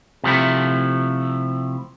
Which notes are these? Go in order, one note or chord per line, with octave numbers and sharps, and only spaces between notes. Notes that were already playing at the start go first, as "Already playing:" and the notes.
C3 F3 A3 E4